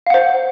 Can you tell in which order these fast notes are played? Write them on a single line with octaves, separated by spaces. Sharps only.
F5 F#5 C5